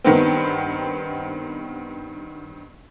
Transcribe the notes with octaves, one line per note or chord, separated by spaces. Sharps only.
G2 D#3 B3 C4